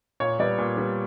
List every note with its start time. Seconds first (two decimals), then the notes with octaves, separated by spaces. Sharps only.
0.20 A#2 C#5
0.39 G3 B3 D5
0.58 A#2
0.77 G3 B3